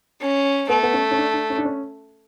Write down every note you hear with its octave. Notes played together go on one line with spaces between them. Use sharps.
C#4
A3 B3
B3
C#4
C#4
D4
D4
C#4
D4
C#4